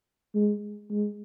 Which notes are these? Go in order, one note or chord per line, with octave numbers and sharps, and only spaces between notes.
G#3
G#3